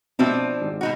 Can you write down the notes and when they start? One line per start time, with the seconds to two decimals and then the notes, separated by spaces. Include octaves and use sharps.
0.19 B2 F3 C4 D4 E5
0.61 G#1
0.81 B2 D#4 F#4